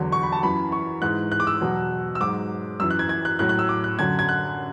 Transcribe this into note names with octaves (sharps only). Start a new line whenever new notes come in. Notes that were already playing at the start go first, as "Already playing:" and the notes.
Already playing: E2 D3 F#3
C#6
B5
A5
F#2 E3 B5
C#6
G#2 E3 F#6
F#6
D6
E6
E2 B2 F#3
E6
G#2 F#3 D6
F#2 E3 E6
F#6
G#6
G#6
F#6
A2 F#3 F#6
F#6
E6
D6
F#6
F#2 D3 F#3 G#6
G#6
F#6